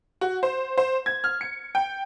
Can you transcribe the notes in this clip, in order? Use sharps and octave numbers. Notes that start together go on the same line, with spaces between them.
F#4
C5
C5
G#6
F6
C#7
G5